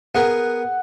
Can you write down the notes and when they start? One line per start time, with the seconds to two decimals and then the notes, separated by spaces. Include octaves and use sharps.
0.15 B3 G#4 A#4 F#5